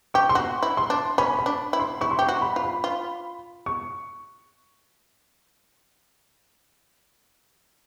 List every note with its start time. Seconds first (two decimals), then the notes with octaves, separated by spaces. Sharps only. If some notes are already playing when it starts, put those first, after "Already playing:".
0.14 G4 C#6
0.29 C6
0.35 F#4 C#6
0.63 E4
0.77 C6
0.90 D4
1.18 C#4 B5
1.39 B5
1.46 D4
1.73 E4
1.80 C6
2.01 E4 C#6
2.11 C6
2.19 G4 C#6
2.29 F#4
2.42 B5
2.56 F4
2.63 B5
2.84 F4
3.66 C#6